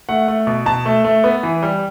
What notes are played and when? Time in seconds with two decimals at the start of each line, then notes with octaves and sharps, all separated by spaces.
0.09 A3 F#5
0.28 A3
0.47 B2
0.66 B2 A5
0.85 A3
1.04 A3
1.24 B3
1.43 E3
1.63 G3